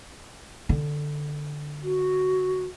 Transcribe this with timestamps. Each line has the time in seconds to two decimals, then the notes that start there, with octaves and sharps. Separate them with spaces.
0.69 D3
1.84 F#4